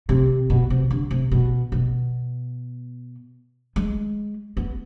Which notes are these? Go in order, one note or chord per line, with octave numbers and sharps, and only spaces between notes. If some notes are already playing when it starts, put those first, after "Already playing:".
C3
B2
C3
D3
C3
B2
B2
G#3
B3